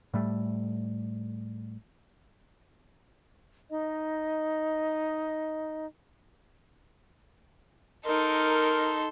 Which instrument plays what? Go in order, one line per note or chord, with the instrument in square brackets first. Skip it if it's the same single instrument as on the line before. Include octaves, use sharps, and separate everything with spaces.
[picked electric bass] A2 G3 A3
[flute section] D#4 D#5
[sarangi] D#4 [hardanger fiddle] A4 C6 [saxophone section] A#4